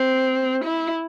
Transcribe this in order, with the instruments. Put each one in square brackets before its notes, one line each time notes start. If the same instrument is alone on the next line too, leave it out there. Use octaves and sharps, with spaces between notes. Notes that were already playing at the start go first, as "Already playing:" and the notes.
Already playing: [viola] C4
E4